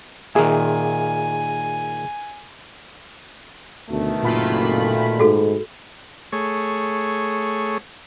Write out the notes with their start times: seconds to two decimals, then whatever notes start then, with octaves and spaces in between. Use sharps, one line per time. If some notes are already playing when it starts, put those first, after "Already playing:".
0.35 A#2 D#3 G#4 E5 G#5
3.90 D2 B2 D#3 A3
4.23 F#1 A#2 F4 B5
5.19 G#2 F#4 G#4 A4
6.32 A3 G#4 C#5